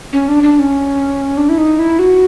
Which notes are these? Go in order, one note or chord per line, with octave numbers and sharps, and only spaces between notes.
C#4
D4
D4
C#4
D4
E4
D#4
E4
F#4